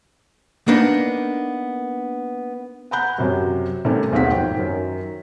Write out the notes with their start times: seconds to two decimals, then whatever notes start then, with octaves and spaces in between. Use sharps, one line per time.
0.68 A#3 B3 D4 D#4
2.91 F#5 G#5 A#5 B5 F#6 G6
3.18 F#2 C3 F#3
3.85 C3 D#3 G3 A3 C#4
4.12 D#1 B1 C4 G#4 F#5 B6
4.31 F2 G#2 G5
4.55 F#2 D#3